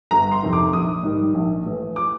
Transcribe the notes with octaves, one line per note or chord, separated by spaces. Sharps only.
G1 A#5
C6
F2 C3 D#3
D6
A#1 D#6
G#2 D#3 G3
A#1
A2 E3
D6